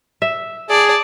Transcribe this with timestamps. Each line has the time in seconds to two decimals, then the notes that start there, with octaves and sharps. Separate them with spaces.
0.22 E5
0.70 G#4 D5 A5